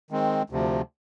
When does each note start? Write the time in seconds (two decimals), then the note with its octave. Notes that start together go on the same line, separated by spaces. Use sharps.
0.11 D#3 G#3 C4
0.50 D2 C3 F3